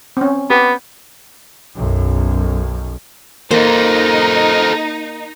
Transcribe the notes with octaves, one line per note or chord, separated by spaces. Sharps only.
C4 C#4
B3 G4
B1 F#2
A#3 D#4 A4 C5